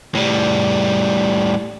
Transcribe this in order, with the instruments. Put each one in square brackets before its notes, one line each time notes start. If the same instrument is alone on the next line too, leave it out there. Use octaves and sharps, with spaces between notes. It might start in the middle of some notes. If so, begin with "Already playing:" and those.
[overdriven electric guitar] A2 G3